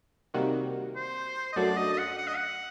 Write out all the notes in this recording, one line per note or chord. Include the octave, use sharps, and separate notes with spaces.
C3 D#3 G3 A#3 F#4
C5
D#5
F#2 F#3 A3 D4 F#4 D5
D#5
D#5
F#5
F#5
D#5
F#5